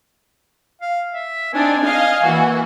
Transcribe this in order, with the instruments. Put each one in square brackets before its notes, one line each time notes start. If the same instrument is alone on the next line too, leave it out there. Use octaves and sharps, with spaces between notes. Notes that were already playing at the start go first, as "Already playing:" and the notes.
[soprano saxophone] F5
E5
[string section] C4 D4 D#4 [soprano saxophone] G#5
[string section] D#5 F5
E3 A#3 F#4